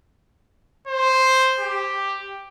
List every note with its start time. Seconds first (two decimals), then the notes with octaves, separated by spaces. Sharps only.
0.87 C5
1.60 G4